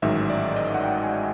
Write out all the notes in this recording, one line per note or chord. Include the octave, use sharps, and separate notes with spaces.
A1 G#2 D#3 F#3 E5
D5
D#5
F#5
G5
G#5